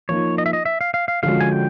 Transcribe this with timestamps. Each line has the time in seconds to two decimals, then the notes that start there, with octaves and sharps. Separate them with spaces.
0.09 F3 A#3 D#4 C#5
0.38 D#5
0.46 E5
0.53 D#5
0.65 E5
0.81 F5
0.94 F5
1.08 F5
1.23 D3 F3 G#3 C#4 F#4 F5
1.40 G#5
1.52 G5